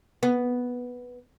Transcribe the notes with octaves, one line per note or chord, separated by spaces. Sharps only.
B3